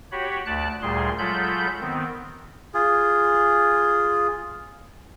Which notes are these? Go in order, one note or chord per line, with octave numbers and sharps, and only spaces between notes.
F#4 G4 C#5 B5
D2 D5 A5 F#6
D2 A#2 G3 G#4 C6
F#3 G#3 F4 A4 B5 G6
D#3 B3 C4
F4 G#4